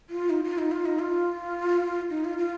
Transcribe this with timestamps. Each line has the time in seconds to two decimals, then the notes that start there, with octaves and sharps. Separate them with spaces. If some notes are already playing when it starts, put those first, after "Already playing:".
0.10 F4
0.30 D#4
0.44 F4
0.58 D#4
0.72 F4
0.85 D#4
0.99 F4
2.10 D#4
2.24 F4
2.38 F4